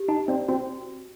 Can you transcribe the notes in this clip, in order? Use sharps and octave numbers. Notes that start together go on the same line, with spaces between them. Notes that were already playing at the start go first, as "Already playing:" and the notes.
Already playing: G4
D#4 A5
C4 D5
C4 F#4